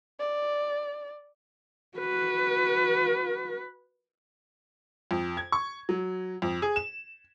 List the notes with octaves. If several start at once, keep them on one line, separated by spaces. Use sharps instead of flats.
D5
F#4 B4
F2
G#6
C#6
F#3
F2
G#4
E7